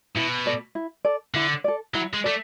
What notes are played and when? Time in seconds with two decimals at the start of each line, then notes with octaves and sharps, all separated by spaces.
0.16 B2 E4
0.46 A4 D5
0.75 E4
1.05 A4 D5
1.34 D3 E4
1.64 A4 D5
1.94 F#3 E4
2.13 G#3
2.24 A3 A4 D5